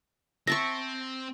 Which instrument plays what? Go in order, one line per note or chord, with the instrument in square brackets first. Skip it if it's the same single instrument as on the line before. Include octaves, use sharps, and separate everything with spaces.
[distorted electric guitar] C4 [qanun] E5 A5 C#6 [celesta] A#6